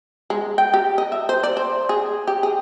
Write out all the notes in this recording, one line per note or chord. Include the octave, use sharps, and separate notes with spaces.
G#3
G5
G4
D#5
E5
C5
D5
C5
G#4
G4
G#4